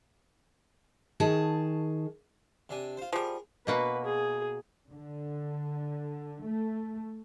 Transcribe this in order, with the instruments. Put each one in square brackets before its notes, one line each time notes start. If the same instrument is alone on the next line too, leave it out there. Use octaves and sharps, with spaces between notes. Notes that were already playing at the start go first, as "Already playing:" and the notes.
[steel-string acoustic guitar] D#3 G#4 A5
[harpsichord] C3 D4 G#5
F4 C5
[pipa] F3 G3 [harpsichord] G#4 A#4
[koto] B2 A#3 F#4 [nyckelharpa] B4
[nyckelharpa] G#4
[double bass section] D3
A3